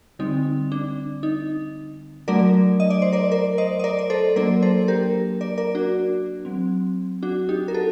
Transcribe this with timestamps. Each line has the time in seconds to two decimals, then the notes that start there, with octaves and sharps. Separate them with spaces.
0.19 D3 G3 C4 D#4
0.72 D4
1.23 D#4
2.28 F#3 A3 D4 A#4 D5
2.80 D#5
2.90 D5
3.02 C5
3.12 A#4 D5
3.31 A#4 D5
3.58 C5 D#5
3.79 D#5
3.84 A#4 D5
3.99 D5
4.10 A4 C5
4.36 F#3 A#3 D4 A#4 D5
4.62 A4 C5
4.88 G4 A#4
5.41 A#4 D5
5.58 A#4 D5
5.75 D4 F#4
6.45 F#3 C4
7.23 D4 F#4
7.49 D#4 G4
7.68 A#4
7.74 F#4 A4